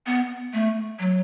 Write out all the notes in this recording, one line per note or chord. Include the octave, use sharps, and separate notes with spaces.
B3
A3
F#3